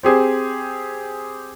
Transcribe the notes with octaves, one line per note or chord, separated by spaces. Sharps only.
C4 G4 G#4 C5